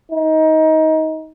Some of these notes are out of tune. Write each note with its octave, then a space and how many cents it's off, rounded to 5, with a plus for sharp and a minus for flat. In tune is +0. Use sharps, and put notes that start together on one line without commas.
D#4 +20